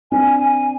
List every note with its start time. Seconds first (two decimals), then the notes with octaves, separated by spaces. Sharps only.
0.12 C4 D4 G#5
0.39 G#5